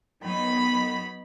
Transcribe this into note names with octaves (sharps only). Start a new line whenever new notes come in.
F#3 B3 D#4 B5